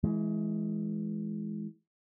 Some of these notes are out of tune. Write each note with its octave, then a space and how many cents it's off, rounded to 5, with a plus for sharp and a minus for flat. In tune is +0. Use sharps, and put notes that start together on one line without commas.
E3 +0 G#3 +20